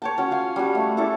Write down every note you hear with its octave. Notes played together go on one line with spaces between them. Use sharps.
C#5 G5 A5
C#4 F#4
F4 F5 G#5
G3 C#4 F#4
A3
C#4 E4 A4 D5